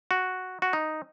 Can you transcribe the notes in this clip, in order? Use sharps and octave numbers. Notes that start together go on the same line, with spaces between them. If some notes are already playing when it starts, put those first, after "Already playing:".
F#4
F#4
D#4